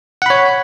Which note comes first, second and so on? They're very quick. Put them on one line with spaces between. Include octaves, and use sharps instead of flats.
F#5 B5 C#5